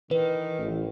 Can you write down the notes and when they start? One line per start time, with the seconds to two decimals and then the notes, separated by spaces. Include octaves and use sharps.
0.11 D#3 E3 B4
0.59 A1